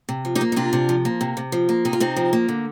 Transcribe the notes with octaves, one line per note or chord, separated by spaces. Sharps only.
C3
F3
D#4 G4
A#3
D#4
C3 D4 F4
C3
F3
A#3
C3
C3
F3
A#3
C3 D#4
F4
C3 C4 D#4
F3
A#3
D3